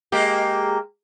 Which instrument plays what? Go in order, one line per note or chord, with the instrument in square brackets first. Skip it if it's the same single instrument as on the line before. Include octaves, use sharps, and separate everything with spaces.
[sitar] G#3 A#3 G4